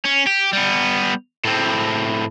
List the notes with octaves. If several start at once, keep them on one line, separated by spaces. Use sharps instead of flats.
C#4
G4
G3 B3
A2 C4